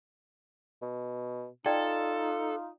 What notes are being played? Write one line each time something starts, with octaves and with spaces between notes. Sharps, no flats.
B2
D#4 F4 A4 D5 G5